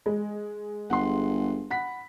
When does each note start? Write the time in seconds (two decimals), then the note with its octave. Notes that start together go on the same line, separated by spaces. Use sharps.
0.06 G#3
0.90 G1 F#5 C6
1.71 F#5 B5 B6